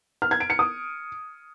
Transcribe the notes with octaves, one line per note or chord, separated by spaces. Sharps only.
F6
G#6
D7
C#7
D#6